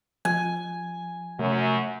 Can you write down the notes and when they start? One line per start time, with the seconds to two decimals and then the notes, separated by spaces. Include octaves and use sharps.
0.25 F3 G#5
1.39 F#2 C3 A3